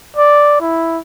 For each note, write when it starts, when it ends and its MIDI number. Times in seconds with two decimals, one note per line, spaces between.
0.17 0.60 74
0.61 0.99 64